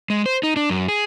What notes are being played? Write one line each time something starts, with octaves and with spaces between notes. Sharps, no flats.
G#3
C5
D#4
D4
F#2
G#4